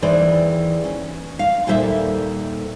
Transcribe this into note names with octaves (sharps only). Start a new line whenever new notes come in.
D#2 E3 G#4 C5 D5
C#4
F5
D#2 A#2 G3 A4 C5 E5